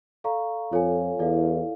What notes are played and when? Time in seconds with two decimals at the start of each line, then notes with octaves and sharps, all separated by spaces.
0.24 A4 D5 F5 A#5 C#6
0.72 F2 F4 A4 C#5 F5 G#5
1.19 E2 E4 A4 D5 F5